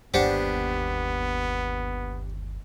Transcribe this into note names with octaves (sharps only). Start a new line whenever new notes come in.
G1 D#2 B3 D4 G4 C5 D5 F#5